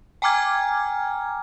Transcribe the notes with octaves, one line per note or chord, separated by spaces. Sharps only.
G5 G#5 A#5 D6 F6 G#6